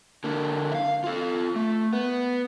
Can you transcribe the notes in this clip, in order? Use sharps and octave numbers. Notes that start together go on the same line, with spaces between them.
D3 A#3
E5 F5
F4 A4
A3
B3